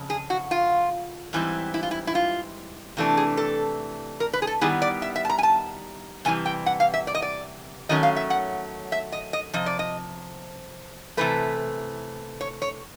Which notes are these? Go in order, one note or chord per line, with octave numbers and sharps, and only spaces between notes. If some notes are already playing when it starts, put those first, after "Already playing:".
Already playing: F2 C#3
G#4
F#4
F4
G#2 E3 G3 C4 E4
E4
F4
E4
E4
F4
C3 E3 A3 D4
G#4
A4
A#4
B4
G#4
A4
D#3 G3 B3 E4 G#4
D5
E5
E5
A5
A#5
G#5
A5
E2 C3 E3 G3 G#5
G5
F#5
F5
E5
D5
D#5
D5
D#3 F#3 A3 C#4 D#5
F5
E5
F#5
E5
D#5
D#5
C3 F3 D#5
D5
D#5
C3 E3 A3 B4
C#5
C#5